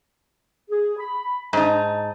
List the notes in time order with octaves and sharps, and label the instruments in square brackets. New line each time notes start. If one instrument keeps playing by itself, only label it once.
[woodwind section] G#4
B5
[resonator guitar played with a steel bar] G#2 D#4 [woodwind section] A5